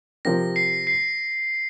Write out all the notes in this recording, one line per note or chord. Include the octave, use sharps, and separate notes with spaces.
C3 F3 C4 G4 A#4 A#6
C7
C7